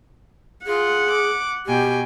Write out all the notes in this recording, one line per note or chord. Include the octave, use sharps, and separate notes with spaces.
F4 G#4 F#5
D6
B2 G4 G5 G#5